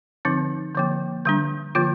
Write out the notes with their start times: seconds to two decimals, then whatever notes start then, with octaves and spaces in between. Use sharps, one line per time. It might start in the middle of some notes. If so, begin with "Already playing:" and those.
0.25 D3 F3 C4 D#4
0.75 D3 F3 A#3
1.25 D3 G3 D4
1.75 D3 F3 A#3 F4